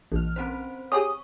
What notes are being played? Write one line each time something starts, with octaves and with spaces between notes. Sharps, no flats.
A#1 E3 F6
C4 C#4 C5
G4 G#4 C#5 C#6 D#6